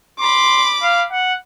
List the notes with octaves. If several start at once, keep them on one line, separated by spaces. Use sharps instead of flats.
B5 C6 D6
F5
F#5